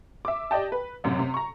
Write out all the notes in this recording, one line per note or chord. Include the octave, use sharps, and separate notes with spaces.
E5 D6
G4 D5 D#5 G5 A5
B4
A1 F#2 C3
C3
A#5 C#6